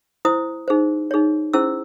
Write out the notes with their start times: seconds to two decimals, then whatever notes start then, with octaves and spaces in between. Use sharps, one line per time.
0.25 E4 C5 D#6
0.68 D#4 G#4 C5
1.11 D#4 G#4 C#5
1.54 C#4 E4 G#4 C5 E6